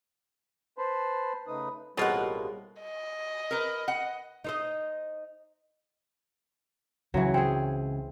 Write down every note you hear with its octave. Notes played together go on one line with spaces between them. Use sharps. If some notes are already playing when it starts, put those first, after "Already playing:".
B4 C5 A5 B5 C6
C#3 A3 D#4 B4 D#6
A1 B2 G3 G#3 A#3 C4 F4 F#5
D#5
A#4 B4
F#5
D#4 C5 D#5
C#2 C#3 E3 F#3
C4 G#4 G5